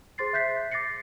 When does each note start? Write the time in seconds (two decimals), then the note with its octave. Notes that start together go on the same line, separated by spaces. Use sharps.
0.18 G#4 C5 C6 A6 C7
0.33 E5 F#6 G6 B6 C7
0.71 D6 A6 A#6 C7 C#7